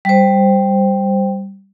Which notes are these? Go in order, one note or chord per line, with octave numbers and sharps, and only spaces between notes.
G3 C5